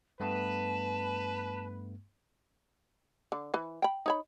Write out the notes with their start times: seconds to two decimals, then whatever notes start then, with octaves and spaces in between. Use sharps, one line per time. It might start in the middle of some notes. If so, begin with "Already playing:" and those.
0.20 G2 A3 B3 B4 A5
3.32 D3
3.54 E3 B4
3.82 G5 B5
4.06 D#4 C#5 B5